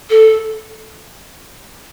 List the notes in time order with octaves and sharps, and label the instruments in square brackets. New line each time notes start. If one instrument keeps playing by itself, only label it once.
[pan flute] A4